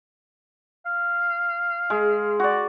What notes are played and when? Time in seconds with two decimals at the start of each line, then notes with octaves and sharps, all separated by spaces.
0.86 F5
1.90 G#3
2.40 F#4 D5